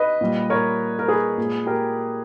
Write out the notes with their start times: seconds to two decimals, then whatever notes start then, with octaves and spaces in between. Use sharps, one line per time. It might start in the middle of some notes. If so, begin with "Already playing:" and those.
Already playing: B4 D#5
0.21 A#2 G3
0.50 A#4 C#5
0.99 A#4
1.08 G#4 B4
1.38 A#2 G#3
1.66 G4 A#4